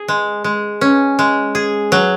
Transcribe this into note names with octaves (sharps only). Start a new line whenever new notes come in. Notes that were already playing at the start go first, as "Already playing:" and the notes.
Already playing: G#4
G#3
G#3
C#4
G#3
G#4
F#3